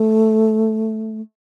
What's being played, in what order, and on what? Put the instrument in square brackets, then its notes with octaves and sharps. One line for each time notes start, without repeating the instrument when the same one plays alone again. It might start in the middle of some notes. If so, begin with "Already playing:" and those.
Already playing: [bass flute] A3